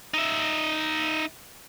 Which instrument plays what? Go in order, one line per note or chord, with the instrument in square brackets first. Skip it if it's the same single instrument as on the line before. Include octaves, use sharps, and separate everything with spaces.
[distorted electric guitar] D#4 E5